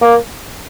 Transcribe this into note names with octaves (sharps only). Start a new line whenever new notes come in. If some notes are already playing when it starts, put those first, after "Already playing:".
A#3